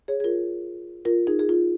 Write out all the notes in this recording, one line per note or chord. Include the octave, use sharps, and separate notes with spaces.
G#4 C#5
G#4
F4 A#4
F4 A#4
D#4 G#4
G#4
F4